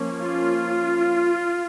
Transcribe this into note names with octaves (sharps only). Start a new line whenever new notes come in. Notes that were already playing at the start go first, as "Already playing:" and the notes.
Already playing: F3 A#3 C#4
F4